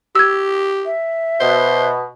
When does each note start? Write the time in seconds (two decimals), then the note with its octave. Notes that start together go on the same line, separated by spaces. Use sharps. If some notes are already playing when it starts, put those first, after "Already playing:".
0.15 G4 E6 G#6
0.86 E5
1.40 B2 C5